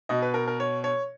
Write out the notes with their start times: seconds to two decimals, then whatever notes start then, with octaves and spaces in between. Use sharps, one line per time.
0.09 B2 D#5
0.22 B4
0.34 A#4
0.48 A#4
0.60 C#5
0.84 C#5